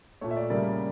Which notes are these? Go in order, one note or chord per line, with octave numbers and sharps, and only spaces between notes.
A#2 A3 C#5
E5
D5
C#3 G3 A#3 D5